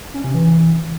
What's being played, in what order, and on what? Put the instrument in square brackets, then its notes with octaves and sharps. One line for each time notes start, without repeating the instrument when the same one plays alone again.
[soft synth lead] C#4
C3
E3